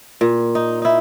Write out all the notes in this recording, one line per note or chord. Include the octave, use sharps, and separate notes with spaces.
A#2
D#4
D#4 E4